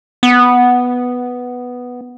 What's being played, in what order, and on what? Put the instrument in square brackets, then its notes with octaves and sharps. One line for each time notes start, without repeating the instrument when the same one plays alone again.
[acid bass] B3